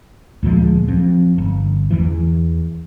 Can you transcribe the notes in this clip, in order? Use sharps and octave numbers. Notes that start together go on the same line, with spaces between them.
D2 A#2 F3 G#3
F2
G1
E2 E3